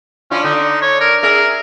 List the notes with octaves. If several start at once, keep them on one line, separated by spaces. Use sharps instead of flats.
C#4 D4 E4 F4
D3 D#4
C#5
A#4
G#4 A#4 E5